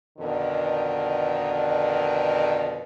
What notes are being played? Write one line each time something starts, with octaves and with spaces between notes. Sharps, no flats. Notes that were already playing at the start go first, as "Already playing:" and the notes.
F2 B2 D3 D#3